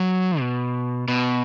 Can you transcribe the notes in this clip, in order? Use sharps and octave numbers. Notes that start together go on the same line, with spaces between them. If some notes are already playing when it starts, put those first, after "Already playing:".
Already playing: F#3
B2
B2